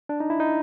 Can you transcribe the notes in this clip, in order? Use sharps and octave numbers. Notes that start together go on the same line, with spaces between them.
D4
D#4
E4
D#4